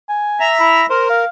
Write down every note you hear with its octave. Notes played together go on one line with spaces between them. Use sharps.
G#5
E5 A#5
E4
A#4 C5
F5